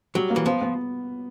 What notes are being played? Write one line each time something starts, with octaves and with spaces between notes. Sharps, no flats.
F#3 G3
A#3
E3
F3 B3
B3